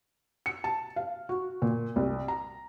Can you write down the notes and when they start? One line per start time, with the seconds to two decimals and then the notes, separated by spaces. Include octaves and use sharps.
0.46 C#7
0.64 A5
0.96 F5
1.29 F#4
1.62 A#2
1.96 C2
2.28 A#5